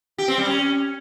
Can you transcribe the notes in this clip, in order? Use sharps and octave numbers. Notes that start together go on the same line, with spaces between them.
G4
C4
G3
C#4